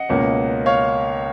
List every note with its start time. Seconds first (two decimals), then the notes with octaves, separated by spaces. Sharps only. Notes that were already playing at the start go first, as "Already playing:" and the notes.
Already playing: D#5 F#5
0.09 C#2 B2 A#3 C#4
0.66 C#5 F5